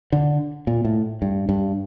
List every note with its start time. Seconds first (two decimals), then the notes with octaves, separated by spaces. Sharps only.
0.12 D3
0.67 A#2
0.85 A2
1.22 G2
1.49 G2